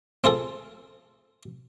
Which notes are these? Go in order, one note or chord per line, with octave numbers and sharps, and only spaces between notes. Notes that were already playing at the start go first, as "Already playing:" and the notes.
C4 F4 G#4 A4